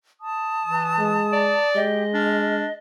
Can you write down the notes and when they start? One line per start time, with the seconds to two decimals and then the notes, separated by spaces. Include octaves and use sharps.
0.20 A5 D#6
0.65 E3
0.99 G#3
1.32 D5
1.75 G#3 G4 D#5
2.14 D4 F6